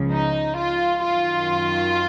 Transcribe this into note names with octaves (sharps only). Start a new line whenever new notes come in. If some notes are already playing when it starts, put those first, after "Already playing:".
Already playing: C#2 C#3 F3
D#4
F4
F#2 D#3 F4